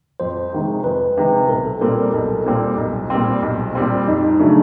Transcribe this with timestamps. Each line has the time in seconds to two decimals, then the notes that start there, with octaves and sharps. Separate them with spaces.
0.20 F2 C5
0.53 C3 D#3 G#3
0.84 F2 B4
1.17 C3 D#3 G#3
1.49 B1 A#4
1.65 A4
1.81 A#2 G3 C4 A#4
1.98 A#4
2.13 B1 A4
2.46 A#2 G3 C4
2.78 B1
3.10 A#2 G3 C4
3.42 B1
3.75 A#2 G3 C4
4.07 F2 D#4
4.23 D#4
4.39 C#3 F#3 A3 D4